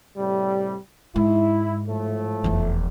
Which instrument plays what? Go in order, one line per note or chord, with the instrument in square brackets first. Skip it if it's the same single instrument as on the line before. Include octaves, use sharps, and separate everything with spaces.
[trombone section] A2 C3 G3
[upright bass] G#2 [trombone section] E4
[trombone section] A2 F3 A3
[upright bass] F1 E2